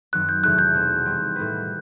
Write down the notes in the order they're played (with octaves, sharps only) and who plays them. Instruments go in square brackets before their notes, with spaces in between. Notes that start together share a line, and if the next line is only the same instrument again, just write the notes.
[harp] F#2 D#3 F#3 C4 [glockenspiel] F#6
[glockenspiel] G6
[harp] E2 C3 D#3 A3 [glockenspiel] F#6
[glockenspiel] G6
[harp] B2 A3 C4 F#4
D#3 G3 C4
A2 G3 D#4 F#4 B4